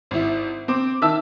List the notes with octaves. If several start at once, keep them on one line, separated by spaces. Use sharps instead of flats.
G#1 E4
C4 D6
D#3 E5 A5 E6